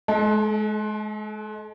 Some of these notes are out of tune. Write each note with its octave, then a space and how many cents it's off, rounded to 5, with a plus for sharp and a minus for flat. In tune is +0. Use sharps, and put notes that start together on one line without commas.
G#3 +30 A4 -35 A5 +0